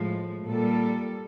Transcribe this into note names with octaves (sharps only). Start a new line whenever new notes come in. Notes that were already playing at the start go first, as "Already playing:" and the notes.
Already playing: A2 F3 G#3
A#2 G3 A4